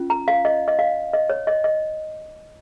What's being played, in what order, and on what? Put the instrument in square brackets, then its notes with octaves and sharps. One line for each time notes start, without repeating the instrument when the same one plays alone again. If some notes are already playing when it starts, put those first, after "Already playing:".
Already playing: [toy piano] C#4 F4
A#5
F5
D#5
D#5
F5
D#5
C#5
D#5
D#5